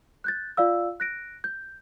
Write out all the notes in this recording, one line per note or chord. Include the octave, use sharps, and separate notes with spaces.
F#6 G6 A6
F4 D5 F5 E6
F#6 A#6 D7
G6